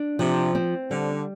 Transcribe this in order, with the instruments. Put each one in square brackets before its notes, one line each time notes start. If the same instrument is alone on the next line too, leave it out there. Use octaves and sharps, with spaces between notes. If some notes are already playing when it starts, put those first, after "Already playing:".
Already playing: [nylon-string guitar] D4
[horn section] C3 [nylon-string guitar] F3
[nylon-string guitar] C4
[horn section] D3 [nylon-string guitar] G3